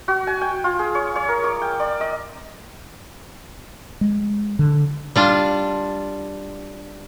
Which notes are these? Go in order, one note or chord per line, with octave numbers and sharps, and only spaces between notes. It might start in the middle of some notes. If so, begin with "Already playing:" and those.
F#4
G#5
G5
F4
G#4
C#5
C#5
A#4
D6
G5
D5
D#5
G#3
D3
G3 D4 F4